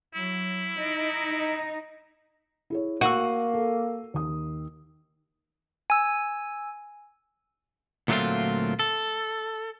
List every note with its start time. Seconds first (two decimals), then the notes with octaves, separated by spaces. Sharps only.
0.14 F#3 E4
0.76 D#4
2.70 E4 G#4 C#5
3.01 A#3 F#4 E6 C7 D#7
3.54 A4
4.14 D#2 D#6
5.90 G#5 E6
8.08 D2 A#2 F#3 A3 C4 F4
8.79 A4